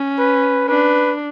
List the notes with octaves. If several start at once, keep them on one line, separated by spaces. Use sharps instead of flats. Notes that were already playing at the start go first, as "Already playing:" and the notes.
Already playing: C#4
B4
D4 B4